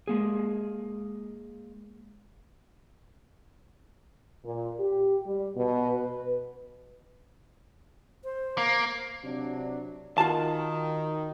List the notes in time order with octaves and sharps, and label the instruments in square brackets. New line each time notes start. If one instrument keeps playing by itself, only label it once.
[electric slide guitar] G#3 A#3 G#4
[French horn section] A#2
G4
G3
B2
B4
[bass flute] C5
[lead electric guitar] A#3
[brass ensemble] C3 F#3 D4
[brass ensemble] D#3 [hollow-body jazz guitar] F4 F#4 A5